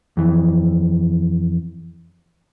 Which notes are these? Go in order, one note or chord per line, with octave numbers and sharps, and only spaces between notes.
F2 E3